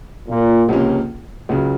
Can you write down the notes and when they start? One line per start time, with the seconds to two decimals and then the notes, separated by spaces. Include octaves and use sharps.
0.28 A#2
0.69 C#2 C3 F3 A#3 C#4
1.49 C#2 C#3 F#3